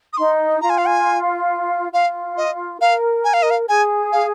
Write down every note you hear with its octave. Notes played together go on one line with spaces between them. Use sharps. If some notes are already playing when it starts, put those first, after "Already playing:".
D#6
D#4 C6
F4 A#5
G#5
F5
G#5
F4 F5
D#5
A#4 F5
G#5
F5
D#5
F5
G#4 G#5
F5